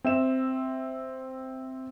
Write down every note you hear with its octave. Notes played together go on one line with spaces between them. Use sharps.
C4 E5 E7